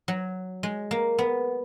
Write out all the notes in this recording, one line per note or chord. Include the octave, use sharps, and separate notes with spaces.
F#3
G#3
A#3
B3